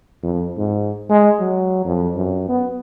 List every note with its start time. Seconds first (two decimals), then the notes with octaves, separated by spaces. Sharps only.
0.23 F2
0.58 G#2
1.10 G#3
1.39 F#3
1.85 F2
2.16 F#2
2.48 B3